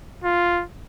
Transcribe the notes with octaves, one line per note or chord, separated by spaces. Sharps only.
F4